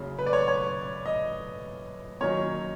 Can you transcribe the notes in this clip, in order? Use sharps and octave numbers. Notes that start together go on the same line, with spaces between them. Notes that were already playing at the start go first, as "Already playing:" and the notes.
Already playing: F#1 F#2 C#3
B4
D5
C#5
C#5
D#5
F#2 D#3 F#3 A#3 C#4 C#5